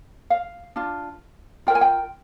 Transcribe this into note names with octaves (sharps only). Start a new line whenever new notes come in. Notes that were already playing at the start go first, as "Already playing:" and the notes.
F5
D4 F4
F4 A#4 G5
G#5
G5